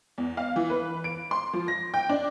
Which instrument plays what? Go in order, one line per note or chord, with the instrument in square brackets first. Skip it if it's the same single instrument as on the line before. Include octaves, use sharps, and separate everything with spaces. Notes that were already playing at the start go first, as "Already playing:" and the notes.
[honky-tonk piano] E2
F5
E3
B4
D7
C6
F3
A#6
G5
D4